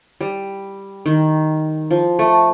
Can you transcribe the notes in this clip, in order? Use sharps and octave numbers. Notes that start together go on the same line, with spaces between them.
G3
D#3
F3
A3